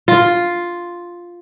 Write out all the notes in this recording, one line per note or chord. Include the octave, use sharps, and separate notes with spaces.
F4